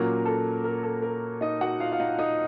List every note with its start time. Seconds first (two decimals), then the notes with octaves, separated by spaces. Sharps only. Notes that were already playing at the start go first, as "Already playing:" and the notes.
Already playing: A#2 F#3 A#3 C#4 A#4
0.25 A4
0.64 A#4
0.83 A4
1.02 A#4
1.41 D#4 D#5
1.61 F#4 F#5
1.80 F4 F5
1.92 F5
2.00 D#4 D#5
2.19 D#4 D#5